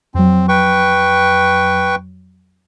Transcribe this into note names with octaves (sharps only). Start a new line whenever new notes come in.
F2 F#3 C4
B4 G5 C#6